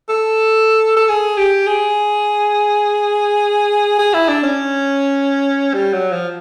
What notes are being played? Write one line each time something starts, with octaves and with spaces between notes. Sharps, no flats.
A4
A4
G#4
G4
G#4
G#4
E4
D4
C#4
G3
F#3
F3